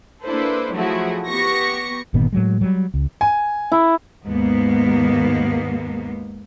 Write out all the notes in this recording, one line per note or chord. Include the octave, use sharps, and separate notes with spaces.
A#3 D4 E4 A4 B4 C5
F3 F#3 A3 E4 F#4 G#4
B3 G4 C#6 A#6 C#7
G1 A#2 D#3 B3
A2 F#3 G#3
F#3 G3
C#2
G#5
E4
D#2 G#2 A#3 B3